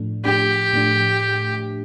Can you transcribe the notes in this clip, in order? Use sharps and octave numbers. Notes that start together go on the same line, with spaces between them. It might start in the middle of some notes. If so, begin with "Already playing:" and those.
Already playing: A2 F3 A3 D4
A2 F3 A3 D4 G4
A2 F3 A3 D4